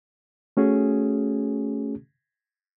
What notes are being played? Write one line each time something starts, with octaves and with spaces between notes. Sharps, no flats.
A3 C#4 F#4 G#4